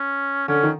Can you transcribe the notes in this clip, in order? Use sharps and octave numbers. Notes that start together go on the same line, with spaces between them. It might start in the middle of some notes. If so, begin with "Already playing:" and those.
Already playing: C#4
D3 C#4
D#3